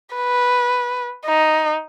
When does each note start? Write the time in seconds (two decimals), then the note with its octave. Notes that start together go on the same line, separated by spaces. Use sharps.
0.16 B4
1.25 D#4